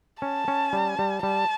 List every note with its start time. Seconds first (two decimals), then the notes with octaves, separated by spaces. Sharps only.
0.22 C#4 A5
0.48 C#4
0.73 G3
0.99 G3
1.23 G3 A5